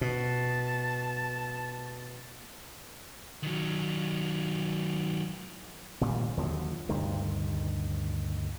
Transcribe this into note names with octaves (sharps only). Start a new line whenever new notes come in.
B2 A5
D#3 F#3
G#1 A#2 C#3 G3
D#2 D3 F3 F#3
D2 G2 C3 D#3